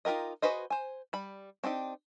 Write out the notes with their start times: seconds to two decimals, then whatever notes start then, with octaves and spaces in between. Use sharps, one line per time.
0.05 D#4 F4 G4 A#4 D#5
0.42 F#4 G#4 B4 C5 D#5
0.70 C5 G#5
1.13 G3 B5
1.64 C4 D4 D#4 G4